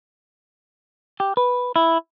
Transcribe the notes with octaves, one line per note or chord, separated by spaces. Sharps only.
G4
B4
E4